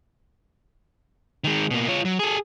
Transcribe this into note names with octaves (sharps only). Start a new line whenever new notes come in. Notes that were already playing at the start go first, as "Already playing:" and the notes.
D#3 G#3
B2 A#3
F4 C#5
F#3
G#4 A4